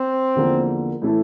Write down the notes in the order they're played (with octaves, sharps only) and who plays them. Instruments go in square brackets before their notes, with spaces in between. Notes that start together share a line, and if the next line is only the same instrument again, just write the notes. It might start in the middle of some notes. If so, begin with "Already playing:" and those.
Already playing: [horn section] C4
[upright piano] E2 D3 F3 A#3
A2 E3 A3 E4 A4